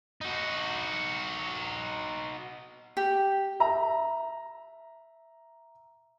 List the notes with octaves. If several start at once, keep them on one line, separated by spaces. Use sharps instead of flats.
D#4 F#4
G4
E5 A#5